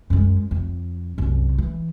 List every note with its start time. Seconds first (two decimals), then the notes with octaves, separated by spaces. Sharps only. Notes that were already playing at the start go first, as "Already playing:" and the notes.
0.10 F#2 G#3
0.51 F2
1.18 C2 F#2
1.58 E3